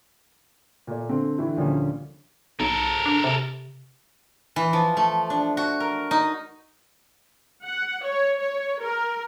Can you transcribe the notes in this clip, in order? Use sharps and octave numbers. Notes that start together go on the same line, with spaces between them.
A#2 A3 D5
D3 A3 C4
A2 D3 E3 E4
D2 A#2 D3 F3 G3 C#4
B1 A4 A#4
D4
C3
E3
F3
A3
D4
F#4
A#4
D#4
F#5
C#5
C#5
A#4